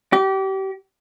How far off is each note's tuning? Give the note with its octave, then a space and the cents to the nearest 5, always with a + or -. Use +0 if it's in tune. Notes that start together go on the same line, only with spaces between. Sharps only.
G4 -30